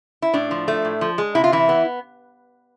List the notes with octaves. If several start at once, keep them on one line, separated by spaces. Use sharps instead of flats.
E4
A2 D4
F3
A3
A2
F3
G#3
C3 E4
F4
E3 E4
B3